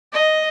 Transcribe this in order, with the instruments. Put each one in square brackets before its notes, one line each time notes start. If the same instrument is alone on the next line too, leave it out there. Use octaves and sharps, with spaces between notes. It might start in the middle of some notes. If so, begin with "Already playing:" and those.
[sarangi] D#5